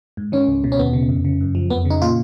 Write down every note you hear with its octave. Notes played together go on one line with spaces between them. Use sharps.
G#2
D#3 C#4
C#2
B2
C#4
D#2 B3
C#3
F2
C#3
F#2
F3
F2 B3
C#3
D#4
A#2 F4